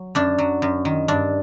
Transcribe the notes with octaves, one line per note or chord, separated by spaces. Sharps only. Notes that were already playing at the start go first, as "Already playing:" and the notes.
Already playing: F#3
F#2 D4
F#3
F#2
D#3
G2 D4